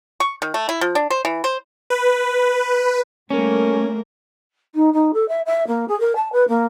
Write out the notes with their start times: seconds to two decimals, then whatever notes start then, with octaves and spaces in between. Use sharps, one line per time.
0.20 C#6
0.42 D#3
0.54 A3
0.69 E4
0.81 F3
0.95 D4
1.10 C5
1.25 E3
1.44 C5
1.90 B4
3.30 G3 A3 A#3 C#4 A#4
4.74 D#4
4.93 D#4
5.13 A4
5.28 E5
5.45 E5
5.67 A#3
5.88 G#4
5.99 A#4
6.15 A5
6.32 B4
6.48 A#3